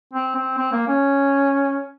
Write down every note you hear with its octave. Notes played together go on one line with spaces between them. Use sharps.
C4
C4
C4
A#3
C#4